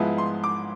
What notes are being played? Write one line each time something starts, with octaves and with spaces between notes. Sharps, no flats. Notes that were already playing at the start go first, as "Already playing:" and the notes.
Already playing: G#2 F3 G#3 B3 E4
C6
D6